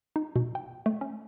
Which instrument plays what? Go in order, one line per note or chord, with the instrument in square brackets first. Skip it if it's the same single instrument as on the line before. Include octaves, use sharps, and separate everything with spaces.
[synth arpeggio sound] D#4
B2
G5
A3
C#4